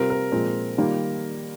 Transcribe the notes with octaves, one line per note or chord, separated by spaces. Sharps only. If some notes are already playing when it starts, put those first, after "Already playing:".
Already playing: C3 G3 C4 F4 A#4
A#4
A#2 F3 G#3 C4
D#3 G3 A#3 F4